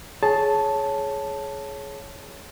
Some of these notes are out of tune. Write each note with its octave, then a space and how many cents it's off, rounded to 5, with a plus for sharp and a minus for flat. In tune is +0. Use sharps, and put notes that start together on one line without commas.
G#4 +20 C#5 +0 A5 +0